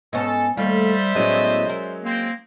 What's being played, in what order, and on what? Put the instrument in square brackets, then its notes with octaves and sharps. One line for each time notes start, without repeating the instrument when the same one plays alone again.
[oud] G#2 B3 C#4 [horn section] A4 [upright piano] D#5
[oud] D#2 A3 [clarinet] G3 [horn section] C5 D5 E5 [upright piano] F5
[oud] A2 B3 [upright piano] F#3 G#3 C#4 [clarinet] D#5
[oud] A#4
[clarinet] A#3 [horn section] C4